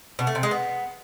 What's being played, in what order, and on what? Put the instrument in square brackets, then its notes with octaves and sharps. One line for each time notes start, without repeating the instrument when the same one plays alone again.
[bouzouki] B2
A3
C3
G#3
B3